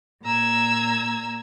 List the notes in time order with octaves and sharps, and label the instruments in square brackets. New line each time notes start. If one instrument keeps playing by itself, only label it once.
[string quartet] A#2 A#5 E6 G#6